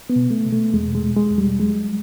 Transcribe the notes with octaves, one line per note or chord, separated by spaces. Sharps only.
B3
B2
A3
B2
A3
E2 G#3
G#3
B2
G#3
E2
G3
F#3 G#3